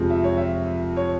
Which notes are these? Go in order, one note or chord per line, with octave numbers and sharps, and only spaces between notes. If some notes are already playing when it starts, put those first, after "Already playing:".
Already playing: F2 C3 F3 G#3 C4
E5
C#5
E5
C#5